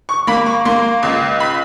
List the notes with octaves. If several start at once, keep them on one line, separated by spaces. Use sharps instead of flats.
C#6
A#3 B5
C#6
A#3 C6
C#2
B5